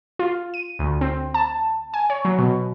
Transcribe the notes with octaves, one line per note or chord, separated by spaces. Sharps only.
F4
D#7
D2
C4
A5
G#5
C#5
F#3
B2